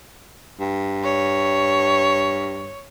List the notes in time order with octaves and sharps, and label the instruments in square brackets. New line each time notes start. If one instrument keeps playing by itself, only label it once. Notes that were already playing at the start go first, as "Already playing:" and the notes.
[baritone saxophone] G2
[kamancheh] C#5